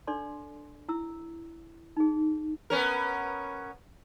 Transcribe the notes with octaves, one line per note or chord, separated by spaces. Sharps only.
D4 A4 D5 C6
E4 E6
D#4 G#4
B3 C#4 A#4